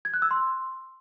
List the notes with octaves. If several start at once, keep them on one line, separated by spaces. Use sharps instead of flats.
G#6
F#6
E6
C6